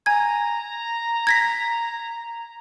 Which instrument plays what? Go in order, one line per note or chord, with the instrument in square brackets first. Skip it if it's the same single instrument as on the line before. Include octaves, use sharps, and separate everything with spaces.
[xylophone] G#5 G#6 [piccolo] A#5
[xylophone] G#6 A#6 B6